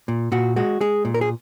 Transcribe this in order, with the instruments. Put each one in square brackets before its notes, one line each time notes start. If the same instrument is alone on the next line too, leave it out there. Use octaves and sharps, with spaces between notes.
[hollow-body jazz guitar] A#2
A#2 F#4
G#3 F#4
G#3 G#4
A#2
A#4
G#4